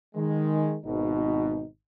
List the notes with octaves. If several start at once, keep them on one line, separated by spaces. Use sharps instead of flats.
D#3 G#3
G#1 B2 D#4